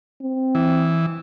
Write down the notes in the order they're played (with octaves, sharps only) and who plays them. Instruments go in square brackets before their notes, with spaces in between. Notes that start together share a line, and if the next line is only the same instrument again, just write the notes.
[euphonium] C4
[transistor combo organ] E3